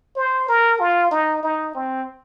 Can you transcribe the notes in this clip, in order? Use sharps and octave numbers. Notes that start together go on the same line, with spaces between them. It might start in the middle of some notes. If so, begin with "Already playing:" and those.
C5
A#4
F4
D#4
D#4
C4